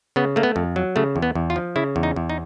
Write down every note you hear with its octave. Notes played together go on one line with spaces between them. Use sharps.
C#3 B3
A3 A#3
B3
F2
F#3
C#3 A3
E2
B3
E2
F4
F3
C#3 E4
E2
D#4
E2
D#4